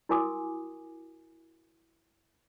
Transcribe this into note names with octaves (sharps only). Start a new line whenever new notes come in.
E4 F#4 A#4 G#5 D6 D#6